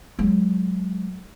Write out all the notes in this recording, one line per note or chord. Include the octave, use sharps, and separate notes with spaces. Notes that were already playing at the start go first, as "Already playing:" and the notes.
F#3 G#3